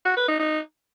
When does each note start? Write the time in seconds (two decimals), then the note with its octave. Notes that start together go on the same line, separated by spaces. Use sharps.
0.05 F#4
0.17 B4
0.28 D#4
0.40 D#4